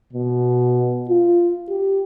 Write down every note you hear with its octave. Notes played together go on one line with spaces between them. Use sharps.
B2
F4
G4